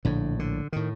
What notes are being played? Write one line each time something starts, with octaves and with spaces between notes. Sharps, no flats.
A#1 A2 D3
D3
A2 D#3